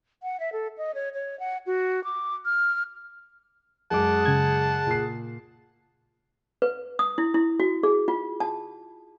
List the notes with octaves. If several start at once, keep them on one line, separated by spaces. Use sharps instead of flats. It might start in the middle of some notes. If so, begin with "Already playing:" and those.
F#5
E5
A4
D#5
C#5
C#5
F#5
F#4
D6
F6
F#2 G#3 G#4 F#5 A5 D6
C#3 G#6
A#2 C7
B4
D#6
E4
E4
F#4
G#4
F4
A5